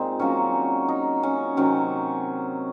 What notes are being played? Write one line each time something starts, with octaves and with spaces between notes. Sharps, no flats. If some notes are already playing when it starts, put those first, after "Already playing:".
Already playing: A#2 G#3 C4 D#4
D#3 F#3 A#3 C#4
D#4
C#4
C3 D#3 F#3 C#4